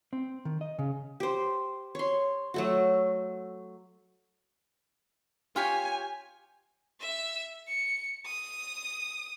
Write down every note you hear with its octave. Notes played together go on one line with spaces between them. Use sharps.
C4
D#3
D#5
C#3
G4 C5
C#5 C6
F#3 A3 F#4
F4 G4 C#5 G#5
E5 E6
C#7
D#6